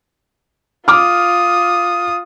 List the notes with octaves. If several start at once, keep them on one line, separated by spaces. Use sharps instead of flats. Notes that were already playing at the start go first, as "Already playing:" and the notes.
F4 D6 D#6 F6